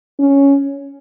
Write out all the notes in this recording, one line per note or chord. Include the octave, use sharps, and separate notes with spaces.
C#4